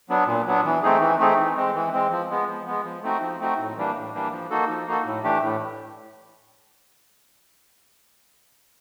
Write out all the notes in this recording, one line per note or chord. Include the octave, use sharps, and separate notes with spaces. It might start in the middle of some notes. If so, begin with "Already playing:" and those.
F#3 B3 D4
A#2
F#3 B3 D4
E3
A3 C4 D#4 G#4
E3
A3 C4 D#4 G#4
E3
G#3 C4
E3
G#3 C4
F3
G#3 B3
F3
G#3 B3
F3
A3 C4 D#4 F#4
F3
A3 C4 D#4 F#4
A2
E3 G3 A#3 D4
A2
E3 G3 A#3 D4
F3
A#3 D#4 F#4 A4
F3
A#3 D#4 F#4 A4
A2
E3 A3 D4 G4
A2